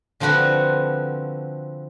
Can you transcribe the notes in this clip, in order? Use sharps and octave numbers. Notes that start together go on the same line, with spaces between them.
D3 F3 C4 F#4 B4 F#5